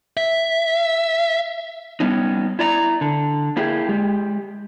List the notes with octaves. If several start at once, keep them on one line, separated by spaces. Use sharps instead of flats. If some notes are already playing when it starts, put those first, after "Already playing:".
E5
G3 B3 C#4 D#4
E4 D5 A#5
D3
A#3 E4 G4 G#4
G#3 G4